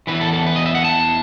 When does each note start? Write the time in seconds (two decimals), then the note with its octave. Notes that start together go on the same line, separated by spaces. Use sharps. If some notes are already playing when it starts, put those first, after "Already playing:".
0.07 E2 C#3 E3 B4
0.21 A4
0.33 A4
0.46 B4
0.56 D#5
0.66 E5
0.75 F#5
0.85 A5